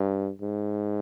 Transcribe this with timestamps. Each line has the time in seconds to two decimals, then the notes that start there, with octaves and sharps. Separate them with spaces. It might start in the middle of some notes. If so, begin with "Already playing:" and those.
Already playing: G2
0.42 G#2